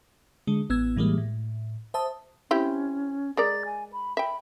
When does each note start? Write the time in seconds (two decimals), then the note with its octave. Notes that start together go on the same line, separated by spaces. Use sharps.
0.47 D3 G#3
0.70 A1 B3 E6 G#6
0.97 A2 E3 G3 G#3 A#3
1.18 A2
1.94 C5 E5 A5 D#6
2.51 C4 C#4 E4 G4
3.37 G#3 A#4 D5 A6
3.65 G#5
3.93 B5
4.17 E5 G5 B5